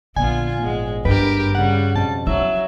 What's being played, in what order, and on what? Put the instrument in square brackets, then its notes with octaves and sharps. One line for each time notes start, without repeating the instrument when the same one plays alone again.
[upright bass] A#1 [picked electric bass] D3 [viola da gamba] B3 F4 [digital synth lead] G#5
[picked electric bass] G#1 B3 [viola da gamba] G#3
[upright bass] G2 [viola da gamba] D4 G4 A#4 [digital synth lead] B4
[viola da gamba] C#3 G3 [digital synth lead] F#5
[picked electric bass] F2 B2 [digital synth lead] A5
[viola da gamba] F#3 [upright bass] E4 [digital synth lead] E5